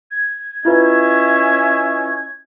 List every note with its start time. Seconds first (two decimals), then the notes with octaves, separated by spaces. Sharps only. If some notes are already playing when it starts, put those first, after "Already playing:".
0.11 G#6
0.65 C#4 E4 F4 B4 D#5 E5